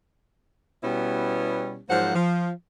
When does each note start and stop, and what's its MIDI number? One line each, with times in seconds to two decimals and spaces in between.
0.83 1.80 47
0.83 1.80 55
0.83 1.80 59
0.83 1.80 61
0.83 1.80 64
0.83 1.80 67
1.89 2.10 44
1.89 2.10 53
1.89 2.10 54
1.89 2.10 58
1.89 2.10 72
1.89 2.10 78
2.14 2.50 53